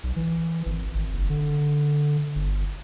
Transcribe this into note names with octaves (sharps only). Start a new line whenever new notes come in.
B1
E3
G#1
G#1
F#1
D3
G1